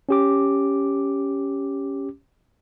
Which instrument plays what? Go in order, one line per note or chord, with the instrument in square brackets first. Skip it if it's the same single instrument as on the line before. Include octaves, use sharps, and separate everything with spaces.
[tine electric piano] C#4 G4 D6